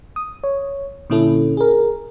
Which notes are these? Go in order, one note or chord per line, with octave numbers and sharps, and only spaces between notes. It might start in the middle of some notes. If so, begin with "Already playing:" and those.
D#6
C#5
A#2 D3 C#4 E4 A4
G#4 A#4